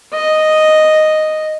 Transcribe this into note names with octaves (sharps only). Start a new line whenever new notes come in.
D#5